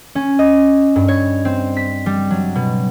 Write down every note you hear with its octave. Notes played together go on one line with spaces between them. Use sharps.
C#4
D#5
G2
C#5
C4
B6
G3
F#3
B2